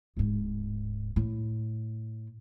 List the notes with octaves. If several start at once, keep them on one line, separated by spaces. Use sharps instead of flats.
D1 G#2
A2